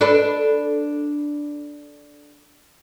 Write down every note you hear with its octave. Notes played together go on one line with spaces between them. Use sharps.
D4 A4 B4